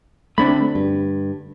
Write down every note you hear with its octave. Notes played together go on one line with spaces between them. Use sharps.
D2 A3 B3 C4 D4 B5
G2